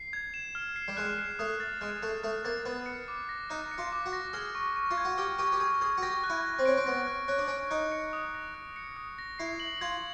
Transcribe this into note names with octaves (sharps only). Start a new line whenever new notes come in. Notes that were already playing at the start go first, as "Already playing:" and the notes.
Already playing: C7
G#6
E7
F6
C7
G3
G#3 F#6
C7
A3 D#6
A6
G#3 F#6
A3 C7
A3 D#6
A#3 A6
B3 F#6
C#7
D6
A#6
D#4 F#6
C#7
F4
D6
F#4
A#6
G#4 F6
C#6
C#6
F4
G#6
F#4
G4 F6
G4 C#6
G4
G#4 C#6
G#4 G#6
F#4
G4 A#6
F#6
E4
F#6
C4
C#4 D7
C4
B3 A#6
F#6
C#4 F#6
D4
C#4
D7
D#4 F#6
C#7
D#6
A#6
F#6
C#7
D#6
A#6
E4 C7
F#7
F4 G#6